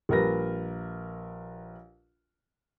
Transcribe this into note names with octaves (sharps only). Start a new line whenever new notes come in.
A#1 G3 A#4 B4 A#6